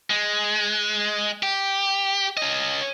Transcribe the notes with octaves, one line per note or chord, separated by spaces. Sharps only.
G#3
G4
C#4 D#5